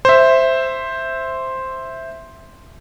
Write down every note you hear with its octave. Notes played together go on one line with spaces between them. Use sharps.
C5 E5